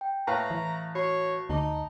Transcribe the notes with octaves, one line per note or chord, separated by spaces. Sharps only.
G5
A2 B4 E5 F5 A#5 C#6
E3
F#4 C#5 B5 C7
D2 D#4 A5 D6